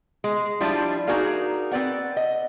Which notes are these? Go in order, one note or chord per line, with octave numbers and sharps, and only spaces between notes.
G#3
F3 G3 D4 E4 F4
D#4 F#4 G#4 A#4 D5 F5
C4 B4 D5 F#5
D#5